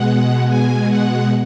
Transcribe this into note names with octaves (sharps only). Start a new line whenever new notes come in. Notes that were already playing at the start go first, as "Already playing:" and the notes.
Already playing: B2 G#3 F#5
G#5
F#5